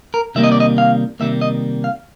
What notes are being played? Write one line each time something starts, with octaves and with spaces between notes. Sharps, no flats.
A#4
C3 D#3 G3 A#3 E5
D#5
D5
D#5
F5
C3 D#3 G3 A#3 E5
D#5
F5